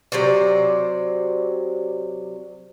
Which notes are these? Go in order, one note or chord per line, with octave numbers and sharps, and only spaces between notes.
C3 F#3 C5 D5